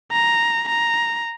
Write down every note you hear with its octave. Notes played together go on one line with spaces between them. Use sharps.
A#5
A#5